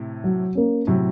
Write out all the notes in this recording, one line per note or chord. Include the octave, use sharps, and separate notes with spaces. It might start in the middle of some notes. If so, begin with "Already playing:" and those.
Already playing: A2 C3
F#3
A#3 C#4
A2 C3 F#3